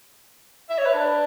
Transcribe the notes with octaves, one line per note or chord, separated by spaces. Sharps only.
E5
C#5
B4
D4